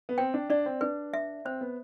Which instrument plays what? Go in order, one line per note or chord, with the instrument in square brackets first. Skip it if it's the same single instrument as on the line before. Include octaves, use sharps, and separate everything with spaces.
[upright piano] B3
[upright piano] C4 [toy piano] G5
[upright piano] D4
[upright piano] D4 [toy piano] D5
[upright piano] C4
[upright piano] D4 [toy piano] B4
[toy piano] E5
[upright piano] C4 [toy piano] C5
[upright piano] B3